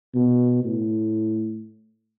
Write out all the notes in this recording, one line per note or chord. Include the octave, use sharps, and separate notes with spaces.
B2
A2